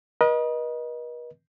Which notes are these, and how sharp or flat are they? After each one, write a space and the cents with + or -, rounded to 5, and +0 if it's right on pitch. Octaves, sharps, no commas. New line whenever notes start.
B4 -45 D#5 +0